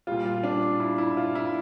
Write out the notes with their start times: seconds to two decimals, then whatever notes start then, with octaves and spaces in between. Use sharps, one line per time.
0.07 A#2 G3 F4
0.25 F4
0.44 D4
0.80 E4
0.98 E4
1.17 F4
1.35 E4